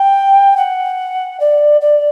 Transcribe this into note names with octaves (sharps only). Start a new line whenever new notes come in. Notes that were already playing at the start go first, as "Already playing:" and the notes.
Already playing: G5
F#5
D5
D5